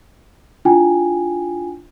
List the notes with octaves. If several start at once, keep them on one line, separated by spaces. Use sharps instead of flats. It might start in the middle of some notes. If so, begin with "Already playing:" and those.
D4 E4 F4 G5 G#5